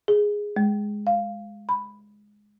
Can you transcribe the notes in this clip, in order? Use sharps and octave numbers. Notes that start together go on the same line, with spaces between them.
G#4
G#3
F5
B5